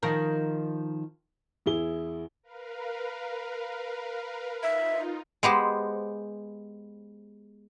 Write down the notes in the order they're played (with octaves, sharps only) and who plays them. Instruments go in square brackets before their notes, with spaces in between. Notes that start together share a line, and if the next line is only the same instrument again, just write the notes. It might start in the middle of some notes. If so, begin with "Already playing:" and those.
[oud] D#3 F3 A#4
[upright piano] E2 E4 G#4 G7
[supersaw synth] A#4 B4 F5
[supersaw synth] D#4 F4 [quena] E5
[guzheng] G#3 B3 G4 C5